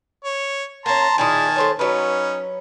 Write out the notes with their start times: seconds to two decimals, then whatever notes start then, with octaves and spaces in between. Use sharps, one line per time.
0.25 C#5
0.86 A#3 C#4 A5 A#5 C6
1.18 A#2 D#3 E4 G#4 G#5 A5
1.56 A3 C5 C#5
1.79 F#3 C#4 D#4 B4